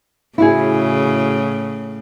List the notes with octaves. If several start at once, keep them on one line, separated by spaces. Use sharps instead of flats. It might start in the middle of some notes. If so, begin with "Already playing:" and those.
A2 C#3 E4 F#4 G#4